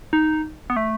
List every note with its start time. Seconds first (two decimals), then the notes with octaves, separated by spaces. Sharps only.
0.13 D#4
0.70 B3
0.76 A3